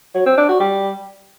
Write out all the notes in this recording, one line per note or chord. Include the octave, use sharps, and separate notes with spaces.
F#3
C4
D4
F#4
G3